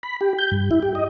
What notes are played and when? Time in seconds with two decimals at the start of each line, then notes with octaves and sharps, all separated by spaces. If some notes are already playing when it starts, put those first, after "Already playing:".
0.03 B5
0.21 G4
0.38 G6
0.51 G2
0.71 E4
0.82 G4
0.95 D#5